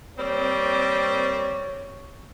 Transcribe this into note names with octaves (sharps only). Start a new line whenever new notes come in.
G3 A#3 C4 C#5